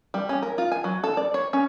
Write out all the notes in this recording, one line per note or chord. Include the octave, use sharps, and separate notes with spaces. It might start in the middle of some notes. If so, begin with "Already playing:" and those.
G3
C#4
A#4
F4
G#5
F#3
A4
D5
C#5
C#4